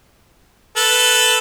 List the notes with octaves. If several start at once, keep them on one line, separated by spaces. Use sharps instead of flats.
A4 B4